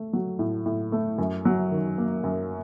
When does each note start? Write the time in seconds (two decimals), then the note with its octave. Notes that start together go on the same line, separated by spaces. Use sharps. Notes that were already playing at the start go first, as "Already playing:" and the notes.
Already playing: A3
0.13 F#3
0.39 A2
0.66 A2
0.92 A3
1.18 F#2
1.45 F#3
1.71 D#3
1.98 A#3
2.24 F#2